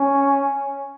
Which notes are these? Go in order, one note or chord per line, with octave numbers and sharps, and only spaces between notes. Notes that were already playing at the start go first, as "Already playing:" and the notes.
Already playing: C#4